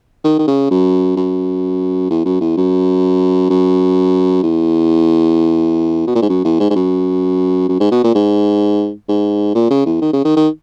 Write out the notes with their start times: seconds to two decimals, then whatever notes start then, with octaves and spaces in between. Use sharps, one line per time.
0.24 D#3
0.39 D#3
0.47 C#3
0.71 F#2
1.17 F#2
2.11 E2
2.25 F#2
2.41 E2
2.57 F#2
3.50 F#2
4.43 E2
6.07 B2
6.15 A#2
6.22 G#2
6.29 F#2
6.45 E2
6.60 G#2
6.70 G#2
6.76 F#2
7.68 F#2
7.80 G#2
7.92 B2
8.04 A#2
8.15 G#2
9.08 G#2
9.55 A#2
9.71 C#3
9.86 E2
10.02 D#3
10.13 C#3
10.25 D#3
10.36 D#3